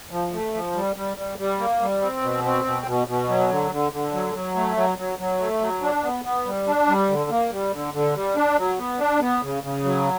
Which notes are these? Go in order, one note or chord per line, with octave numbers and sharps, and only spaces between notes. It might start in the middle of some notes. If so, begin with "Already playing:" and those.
F3
A3
F3
G3
G3
G3
G3
A#3
G3
C4
B2
C4
B2
B2
B2
F#3
D3
D3
D3
F#3
F#3
A3
F#3
F#3
F#3
A3
F#3
D4
B3
B3
G3
D4
G3
D3
A#3
G3
D3
D3
G3
D4
F#3
B3
D4
B3
C#3
C#3
F#3